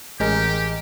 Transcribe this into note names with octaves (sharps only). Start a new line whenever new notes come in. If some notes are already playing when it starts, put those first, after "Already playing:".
A1 G#3 G4 A#4